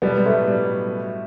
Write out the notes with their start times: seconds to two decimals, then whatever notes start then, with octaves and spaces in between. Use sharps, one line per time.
0.02 B2 F#3 G3 B3
0.17 G3
0.25 A2 A3
0.48 G3